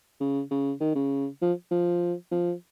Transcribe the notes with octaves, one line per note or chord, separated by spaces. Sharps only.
C#3
C#3
D#3
C#3
F3
F3
F3